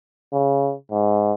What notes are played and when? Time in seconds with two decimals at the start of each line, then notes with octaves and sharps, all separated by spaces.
0.32 C#3
0.91 G#2